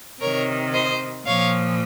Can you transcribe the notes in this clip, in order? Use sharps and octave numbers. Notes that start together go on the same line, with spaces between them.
C3 D#3 A#4 C#5
C5 D#5
A#2 F3 C#5 F5